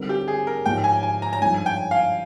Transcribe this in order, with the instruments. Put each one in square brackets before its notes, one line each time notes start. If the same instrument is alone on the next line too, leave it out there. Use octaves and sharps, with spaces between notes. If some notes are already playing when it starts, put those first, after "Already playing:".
Already playing: [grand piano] D3 G3 C4 D#4 A#4
[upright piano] G4
G#4
A#4
[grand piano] G#2 F3 G#3 D#4 G4 [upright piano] G5
[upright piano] G#5
G#5
A#5
A#5
[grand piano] G2 F3 G#3 D#4 [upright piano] G#5
[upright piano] G5
F5